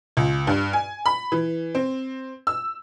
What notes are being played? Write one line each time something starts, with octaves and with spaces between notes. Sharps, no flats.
C#2
G2
G#5
B5
E3
C4
E6